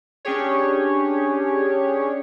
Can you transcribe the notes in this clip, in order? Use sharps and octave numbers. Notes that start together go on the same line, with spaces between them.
C#4 D4 G4 G#4 C#5